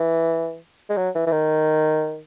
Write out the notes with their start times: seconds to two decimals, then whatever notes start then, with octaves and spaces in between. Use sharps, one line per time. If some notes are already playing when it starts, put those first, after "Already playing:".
Already playing: E3
0.89 G#3
0.97 F#3
1.15 E3
1.27 E3
1.32 D#3